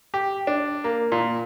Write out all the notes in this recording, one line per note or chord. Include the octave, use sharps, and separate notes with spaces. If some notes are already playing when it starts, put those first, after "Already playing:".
G4
D4
A#3
A#2